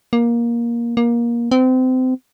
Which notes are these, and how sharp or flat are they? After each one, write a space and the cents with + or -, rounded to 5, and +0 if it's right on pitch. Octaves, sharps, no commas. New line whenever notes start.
A#3 +15
A#3 +20
C4 -30